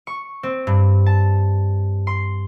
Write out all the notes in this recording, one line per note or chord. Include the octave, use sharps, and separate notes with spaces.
C#6
C4
G2
A5
C6